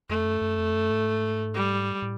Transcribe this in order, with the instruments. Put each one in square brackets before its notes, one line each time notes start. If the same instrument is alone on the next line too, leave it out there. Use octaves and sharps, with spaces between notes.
[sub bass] F2 [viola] A3
[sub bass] F#2
F#2
F2
F#2
G#2
[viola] G3
[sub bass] A2